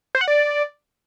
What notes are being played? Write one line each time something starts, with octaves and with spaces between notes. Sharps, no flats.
C5
F#5
D5